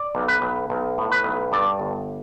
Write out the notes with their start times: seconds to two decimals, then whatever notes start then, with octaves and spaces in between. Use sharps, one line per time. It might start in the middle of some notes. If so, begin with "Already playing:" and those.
Already playing: D5
0.15 B1
0.28 B4
0.42 B1
0.70 B1
0.98 A2
1.11 B4
1.24 B1
1.52 G2 D5
1.80 G1